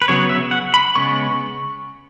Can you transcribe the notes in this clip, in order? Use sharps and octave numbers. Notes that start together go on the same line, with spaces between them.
B4
C#3 F#3 B3 C#5
E5
F#5
B5
C#3 G#3 B3 C#6